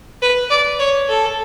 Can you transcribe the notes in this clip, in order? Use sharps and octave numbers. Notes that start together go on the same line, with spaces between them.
B4
D5
C#5
A4